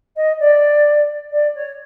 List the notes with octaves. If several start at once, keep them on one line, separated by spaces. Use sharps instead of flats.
D#5
D5
D5
C#5